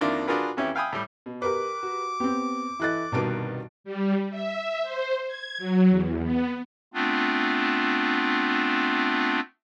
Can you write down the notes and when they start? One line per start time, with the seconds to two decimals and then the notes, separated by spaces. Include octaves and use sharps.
0.01 F2 D#3 A#3 D4 E4 F4
0.27 D4 F4 F#4 G#4 A#4 B4
0.57 F2 E3 C#4 E4 G4
0.75 E5 F5 G5 G#5 B5 D#6
0.93 A2 G3
1.26 B2
1.42 G4 A#4 B4 D6
1.83 F#4
2.20 B3 C4 G4
2.80 E3 E4 A4 D#5 F#6 A6
3.12 C2 G2 B2 D#3 A5 D7
3.84 G3
4.30 E5
4.82 C5
5.27 G#6
5.58 F#3
5.89 E2
6.23 B3
6.94 A3 B3 C4 D4 F4